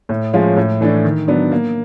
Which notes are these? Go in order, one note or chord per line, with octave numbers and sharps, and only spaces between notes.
A2
F3 G#3 C#4 F4
A2
E3 A3 D4
D#3
F#3 B3 D4
A#3